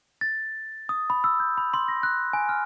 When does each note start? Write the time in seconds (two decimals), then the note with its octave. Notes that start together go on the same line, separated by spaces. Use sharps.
0.21 A6
0.89 D#6
1.10 B5
1.24 E6
1.40 G6
1.57 B5
1.74 C6
1.88 A#6
2.03 F#6
2.33 G#5
2.49 F6